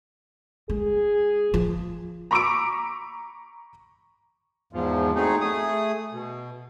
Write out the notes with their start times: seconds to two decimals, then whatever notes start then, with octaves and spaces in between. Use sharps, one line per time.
0.70 G#3 G#4
1.54 F3
2.31 A#5 B5 C#6 D6 E6 D7
4.73 E2 G#2 F3
5.15 F#3 A3 C4 D#4 G#4
5.41 A3 G#4 D#6
6.12 B2